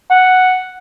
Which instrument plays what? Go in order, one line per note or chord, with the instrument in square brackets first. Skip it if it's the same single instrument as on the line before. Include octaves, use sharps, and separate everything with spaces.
[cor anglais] F#5